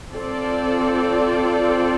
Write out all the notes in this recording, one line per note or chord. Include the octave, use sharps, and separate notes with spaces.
C4 F4 A4 D5